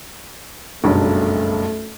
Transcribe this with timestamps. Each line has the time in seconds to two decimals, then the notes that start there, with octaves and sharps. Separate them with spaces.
0.84 F#1 B1 G2 A3